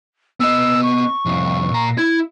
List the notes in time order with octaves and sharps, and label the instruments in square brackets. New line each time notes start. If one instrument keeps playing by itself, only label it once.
[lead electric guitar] B3 D#5 [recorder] E6
[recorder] C#6
[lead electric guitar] C2 F2
A#2 A#5
[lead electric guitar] E4 [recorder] G#6